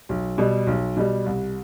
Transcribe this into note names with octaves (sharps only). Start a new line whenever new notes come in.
B1
B2 G3
B1
B2 G3
C2